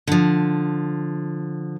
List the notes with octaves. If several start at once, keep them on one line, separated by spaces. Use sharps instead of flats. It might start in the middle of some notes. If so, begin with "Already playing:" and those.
D3 F3